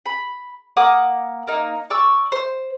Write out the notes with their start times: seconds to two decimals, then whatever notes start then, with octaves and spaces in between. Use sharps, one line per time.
0.06 B5
0.77 A#3 F#5 D6 D#6
1.47 A#3 D#4
1.90 D5 C#6 D6 E6
2.32 C5